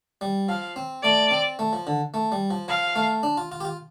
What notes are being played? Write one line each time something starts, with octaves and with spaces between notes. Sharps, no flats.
G3
F3 F5
C4
A3 D5
C4
A3
F3
D3
A3
G3
F3
F3 F5
A3
D4
F4
F4
G4
F4